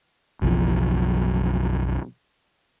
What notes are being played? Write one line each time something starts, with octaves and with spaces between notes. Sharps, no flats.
F#1 B1 E3 F3